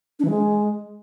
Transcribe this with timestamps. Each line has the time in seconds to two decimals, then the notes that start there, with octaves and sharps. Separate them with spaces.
0.19 D4
0.25 E3
0.30 G#3